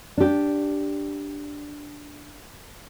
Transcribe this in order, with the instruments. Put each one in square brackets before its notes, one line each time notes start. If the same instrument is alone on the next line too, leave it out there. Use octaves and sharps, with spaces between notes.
[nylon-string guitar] D4 G4